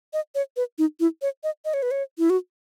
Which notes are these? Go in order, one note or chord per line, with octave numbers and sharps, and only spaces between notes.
D#5
C#5
B4
D#4
E4
C#5
D#5
D#5
C#5
B4
C#5
E4
F#4